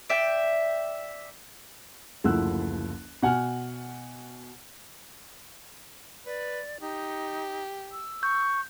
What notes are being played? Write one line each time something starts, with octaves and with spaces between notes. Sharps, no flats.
D5 E5 G5
F#1 D2 F3 E4 E6 F#6
B2 F#5 G#5 F6
B4 D5
D#4 G4
E6
C#6 G6